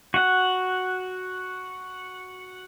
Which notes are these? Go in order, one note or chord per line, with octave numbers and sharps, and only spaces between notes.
F#4 F#5